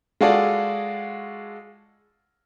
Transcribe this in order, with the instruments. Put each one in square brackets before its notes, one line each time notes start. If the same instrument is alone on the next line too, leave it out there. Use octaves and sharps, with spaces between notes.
[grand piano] G#3 F4 F#4 G#4 A4 D5